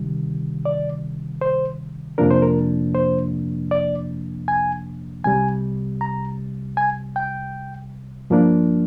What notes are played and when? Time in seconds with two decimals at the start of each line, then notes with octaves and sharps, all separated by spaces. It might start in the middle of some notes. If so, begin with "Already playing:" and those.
Already playing: D2 C3 D#3 G3
0.65 D5
1.41 C5
2.18 F2 C3 F3 A#3 D4 A#4
2.30 C5
2.42 A#4
2.95 C5
3.71 D5
4.48 G#5
5.24 C2 C3 G3 G#5
6.01 A#5
6.77 G#5
7.16 G5
8.30 G2 F3 A#3 D4